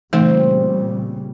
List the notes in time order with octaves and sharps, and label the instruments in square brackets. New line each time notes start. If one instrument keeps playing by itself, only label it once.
[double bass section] A#2 C#3 G3 [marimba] E3 [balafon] A3 D#4 [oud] C4